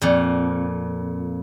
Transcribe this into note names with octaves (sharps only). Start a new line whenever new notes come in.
F2 A#2